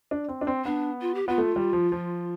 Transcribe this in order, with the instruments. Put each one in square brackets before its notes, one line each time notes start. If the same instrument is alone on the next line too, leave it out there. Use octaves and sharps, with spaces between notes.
[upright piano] D4
C4
D4
C4
[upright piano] B3 [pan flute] D4
[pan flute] F4
G4
[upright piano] B3 [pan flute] F4
[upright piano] A3
G3
F3
F3